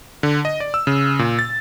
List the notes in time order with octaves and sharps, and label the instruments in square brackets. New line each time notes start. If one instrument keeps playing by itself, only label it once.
[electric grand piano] D3
D#5
D5
E6
C#3
A#2
A6